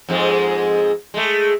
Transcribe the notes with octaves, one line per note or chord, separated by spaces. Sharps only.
F2 G#2 G#3
G#3 A3